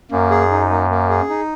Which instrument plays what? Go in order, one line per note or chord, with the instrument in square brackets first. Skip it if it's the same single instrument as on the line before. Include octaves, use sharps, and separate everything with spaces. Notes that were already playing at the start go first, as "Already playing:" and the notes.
[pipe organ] F#2 [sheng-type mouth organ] A#3
[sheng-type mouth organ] G#4
D#4
A#3
A#3
G#4
D#4